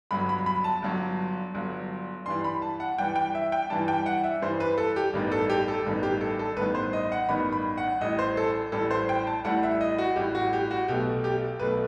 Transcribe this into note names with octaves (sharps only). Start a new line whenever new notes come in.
G1 G2 F#3 B5
B5
B5
A5
G1 G2 F#3
G1 G2 F#3
G2 E3 G3 C6
B5
A5
F#5
G2 E3 G3 G5
G5
E5
G5
G2 E3 G3 A5
G5
F#5
E5
G2 E3 G3 C5
B4
A4
G4
A1 G2 D#3 G3 B3
A4
G4
A4
A1 G2 D#3 G3 B3
G4
A4
A4
A1 G2 D#3 G3 B3 B4
C5
D#5
F#5
A1 G2 D#3 G3 B3 B5
B5
F#5
A1 A2 G3 D#5
C5
A4
A1 A2 G3 A4
C5
G5
A5
A1 A2 G3 F#5
E5
D#5
F#4
A1 A2 G3 G4
F#4
G4
F#4
B1 B2 A3 G4
G4
B1 B2 A3 B4